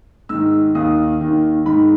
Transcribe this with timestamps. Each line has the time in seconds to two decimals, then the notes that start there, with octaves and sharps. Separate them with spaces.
0.29 G#2 D#3 E6
0.75 D#2 D#3 D#6
1.21 D#2 D#3
1.66 G#2 D#3 B5